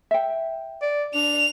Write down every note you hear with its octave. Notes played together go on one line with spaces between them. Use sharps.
E5 G5
D5
D4 F7